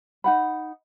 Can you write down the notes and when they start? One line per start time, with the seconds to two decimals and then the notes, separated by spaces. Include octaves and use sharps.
0.24 D#4 F#5 B5